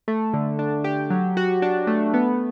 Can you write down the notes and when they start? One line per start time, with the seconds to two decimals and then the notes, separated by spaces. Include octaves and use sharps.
0.08 A3
0.34 D3
0.59 D4
0.84 G4
1.10 F#3
1.37 F#4
1.62 D4
1.87 A3
2.14 B3